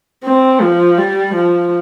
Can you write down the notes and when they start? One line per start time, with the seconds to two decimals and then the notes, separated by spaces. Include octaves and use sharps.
0.25 C4
0.62 F3
0.98 G3
1.35 F3